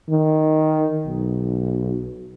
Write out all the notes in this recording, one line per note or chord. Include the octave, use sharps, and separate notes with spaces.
D#3
B1